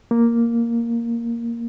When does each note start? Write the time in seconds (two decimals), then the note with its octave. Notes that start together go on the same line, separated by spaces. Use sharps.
0.11 A#3